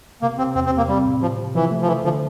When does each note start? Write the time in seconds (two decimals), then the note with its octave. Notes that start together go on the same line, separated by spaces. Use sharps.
0.22 C3 A#3
0.38 C3 C4
0.55 E2 C4
0.66 C4
0.71 C3
0.77 A#3
0.88 G3 C4
1.05 A2
1.21 C3 F3
1.39 C3
1.55 E3 F3
1.71 A3
1.82 F3
1.88 E3 A3
2.04 D3 F3